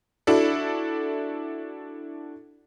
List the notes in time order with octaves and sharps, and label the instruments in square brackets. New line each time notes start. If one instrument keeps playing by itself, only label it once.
[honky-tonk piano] D4 E4 F#4 A4